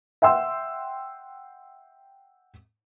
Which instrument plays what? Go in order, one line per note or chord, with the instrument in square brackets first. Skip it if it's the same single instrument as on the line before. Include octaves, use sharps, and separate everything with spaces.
[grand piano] E5 F#5 G5 C6 E6